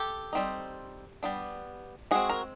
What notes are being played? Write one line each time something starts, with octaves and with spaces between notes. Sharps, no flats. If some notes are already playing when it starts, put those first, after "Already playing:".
Already playing: G4 A4
G3 C4 D#4
G3 B3 D4
E3 G#3 C4 F#4 G#4
A#4